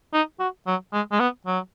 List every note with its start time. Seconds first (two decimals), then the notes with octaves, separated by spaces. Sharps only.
0.13 D#4
0.39 F#4
0.67 F#3
0.93 G#3
1.12 G#3
1.19 B3
1.46 F#3